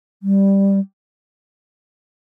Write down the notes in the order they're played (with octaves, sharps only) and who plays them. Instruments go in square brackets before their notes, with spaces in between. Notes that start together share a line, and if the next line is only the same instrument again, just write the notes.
[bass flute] G3